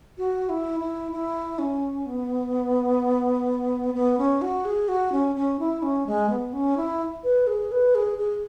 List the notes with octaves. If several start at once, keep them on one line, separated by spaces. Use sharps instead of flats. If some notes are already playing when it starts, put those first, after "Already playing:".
F#4
E4
E4
E4
C#4
B3
B3
C#4
F#4
G#4
F#4
C#4
C#4
E4
C#4
G#3
B3
C#4
E4
B4
G#4
B4
G#4
G#4